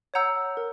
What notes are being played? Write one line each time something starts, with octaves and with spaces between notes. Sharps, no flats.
C#5 F#5 A#5 E6 G6
A#4